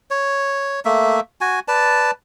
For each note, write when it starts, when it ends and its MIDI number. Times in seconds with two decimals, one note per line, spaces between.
0.11 0.80 73
0.85 1.20 57
0.85 1.20 58
0.85 1.20 76
1.41 1.60 66
1.41 1.60 80
1.68 2.11 71
1.68 2.11 74
1.68 2.11 81